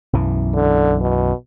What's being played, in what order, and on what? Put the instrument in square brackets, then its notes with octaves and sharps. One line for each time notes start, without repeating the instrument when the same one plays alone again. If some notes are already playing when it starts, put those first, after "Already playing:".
[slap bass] B1 F#2 E3
[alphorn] D3
B2